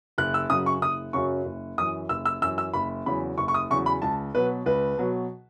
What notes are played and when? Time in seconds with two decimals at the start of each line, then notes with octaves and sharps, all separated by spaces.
0.18 F#1 F#6
0.34 E6
0.50 F#2 C#3 F#3 D#6
0.66 C#6
0.82 F#1 D#6
1.13 F#2 C#3 F#3 C#6
1.45 F#1
1.78 F#2 E3 D#6
2.09 F#1 E6
2.25 E6
2.41 F#2 E3 E6
2.58 E6
2.73 F#1 B5
3.06 E2 C#3 F#3 B5
3.38 F#1 C#6
3.48 C#6
3.54 D#6
3.70 E2 C#3 F#3 C#6
3.86 B5
4.02 C#2 A5
4.35 B2 F#3 B4
4.66 C#2 B4
4.98 B2 F#3